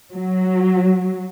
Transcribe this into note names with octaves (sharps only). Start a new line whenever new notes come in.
F#3